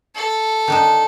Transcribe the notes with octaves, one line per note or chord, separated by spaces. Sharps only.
A4
D#3 D4 D#4